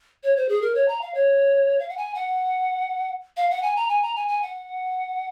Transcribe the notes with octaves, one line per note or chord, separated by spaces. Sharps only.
C#5
C5
G#4
A#4
C#5
A#5
F5
C#5
F5
F#5
G#5
F#5
F5
F#5
G#5
A#5
G#5
A#5
G#5
G#5
F#5